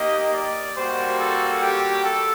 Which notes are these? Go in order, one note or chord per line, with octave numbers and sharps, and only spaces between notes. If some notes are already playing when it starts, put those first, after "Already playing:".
Already playing: A#3 D#4 G4 D#5
D5
G3 A#3 F#4 C5
A4
G4
A4